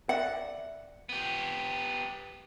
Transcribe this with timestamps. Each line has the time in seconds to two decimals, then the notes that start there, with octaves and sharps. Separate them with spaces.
0.09 D5 E5 F#5
1.09 B3 G4